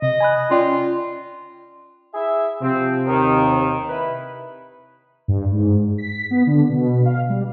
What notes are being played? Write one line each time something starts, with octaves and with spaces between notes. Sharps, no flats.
C3 D#5
G#5 B5 F#6
C#4 F4 D5 G5
E4 G#4 E5
C3 F3 C4
D#2 D#3
E4 B4 B5
G2
G#2
B6
B3
D3
B2
F5
G3